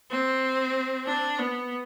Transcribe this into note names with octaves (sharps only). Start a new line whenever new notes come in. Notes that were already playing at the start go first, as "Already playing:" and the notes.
C4
D4
B3